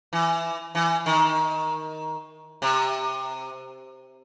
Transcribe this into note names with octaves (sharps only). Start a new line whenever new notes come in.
E3
E3
D#3
C3